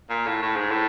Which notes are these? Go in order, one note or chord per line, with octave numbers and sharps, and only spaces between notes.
A#2
A2
A2
G#2
A2